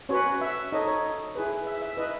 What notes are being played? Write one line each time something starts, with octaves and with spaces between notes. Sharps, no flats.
C#4 F#4 B4 C#5
E5
D#4 A4 C#5 D#5
C#5
E4 G#4 B4
E5
E5
E4 B4 D#5